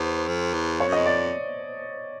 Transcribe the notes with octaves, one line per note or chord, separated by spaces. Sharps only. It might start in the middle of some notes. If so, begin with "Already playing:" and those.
Already playing: E2 C5
F2
E2
F2 C#5
F#2
F2 D#5
D5